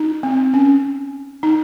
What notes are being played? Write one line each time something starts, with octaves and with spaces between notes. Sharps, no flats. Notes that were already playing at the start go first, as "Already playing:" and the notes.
Already playing: D#4
C4
C#4
D#4